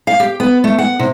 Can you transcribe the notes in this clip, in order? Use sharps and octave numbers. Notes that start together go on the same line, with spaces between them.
F5
G4
B3
A3
F#5
C3